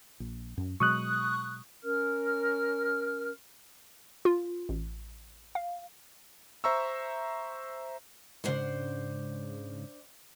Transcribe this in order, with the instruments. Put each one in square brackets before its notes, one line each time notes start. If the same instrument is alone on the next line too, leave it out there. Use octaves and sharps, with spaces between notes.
[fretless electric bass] A#1
F#2
[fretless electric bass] B2 F#3 G#3 [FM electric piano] C#6 D#6 F#6
[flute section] C#4 A#4 F6
[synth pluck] F4
A1
F5
[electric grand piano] C5 E5 A#5 C#6 E6
[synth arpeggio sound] G#2 C#3 [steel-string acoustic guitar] D4 C5 F#5